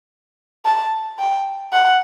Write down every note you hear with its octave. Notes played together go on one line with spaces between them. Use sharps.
A5
G5
F#5